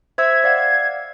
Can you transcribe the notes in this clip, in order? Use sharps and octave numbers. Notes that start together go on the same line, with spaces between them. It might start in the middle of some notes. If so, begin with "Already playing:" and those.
C5 E5 E6 G#6
D5 F5 F#5